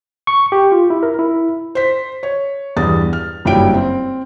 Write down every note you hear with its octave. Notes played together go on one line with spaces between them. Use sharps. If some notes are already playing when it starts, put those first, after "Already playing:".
C#6
G4
F4
E4
A#4
E4
C5 B6
C#5
E2 G2 D#6 A6
F6
F#1 G2 F#3 E4 G5 D7
C4